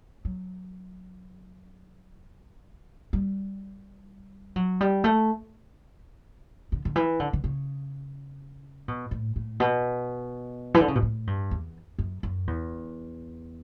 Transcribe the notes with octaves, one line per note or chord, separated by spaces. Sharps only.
F#3
G3
F#3
G3
A3
D3
D3
E3
D3
D3
C#3
B2
A2
A2
B2
E3
D3
C#3
B2
A2
G2
E2
F#2
F#2
E2